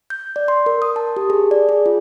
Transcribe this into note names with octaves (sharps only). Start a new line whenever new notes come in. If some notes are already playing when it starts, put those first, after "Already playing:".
G6
D5
C6
A#4
D#6
A5
G4
G#4
D5
G#4
F4